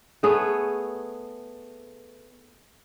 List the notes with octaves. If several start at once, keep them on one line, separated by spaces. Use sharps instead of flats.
A3 B3 G#4 C#5